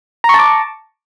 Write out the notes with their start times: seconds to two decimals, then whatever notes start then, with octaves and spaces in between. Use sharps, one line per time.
0.24 A#5
0.29 C#6
0.34 A5
0.39 D6